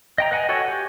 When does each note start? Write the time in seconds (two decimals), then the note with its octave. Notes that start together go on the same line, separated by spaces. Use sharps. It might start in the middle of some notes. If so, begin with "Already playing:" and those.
0.18 D#5 G5 A#5
0.31 B4 D#5 F#5 G#5
0.49 F#4 A4 C#5 F#5 G#5
0.66 G4 G#5